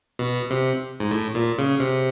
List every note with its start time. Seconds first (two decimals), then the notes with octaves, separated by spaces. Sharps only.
0.19 B2
0.50 C3
1.00 G#2
1.11 A2
1.35 A#2
1.58 C#3
1.80 C3